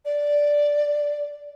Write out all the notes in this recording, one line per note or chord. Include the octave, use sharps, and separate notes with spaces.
D5